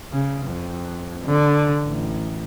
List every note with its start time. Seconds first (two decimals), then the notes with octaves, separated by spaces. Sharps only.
0.12 C#3
0.47 F2
1.25 D3
1.84 A1